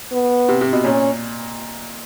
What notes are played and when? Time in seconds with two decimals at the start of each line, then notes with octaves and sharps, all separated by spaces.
0.12 B3
0.49 C3
0.61 C3
0.73 B2
0.84 A#2 C#4